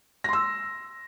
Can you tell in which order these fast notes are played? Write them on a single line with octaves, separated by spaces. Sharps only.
A#6 C6 E6